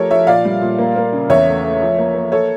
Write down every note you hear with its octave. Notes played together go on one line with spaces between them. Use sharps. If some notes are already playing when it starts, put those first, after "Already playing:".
Already playing: F3 A3 G4 A4 A#4 C#5
F3 C#5 E5
A#2 D5 F5
G3
A#2
A#3
A#3
C#3
E2 C#5 E5
A3
A3
F3
A#3
A#3
A4 C#5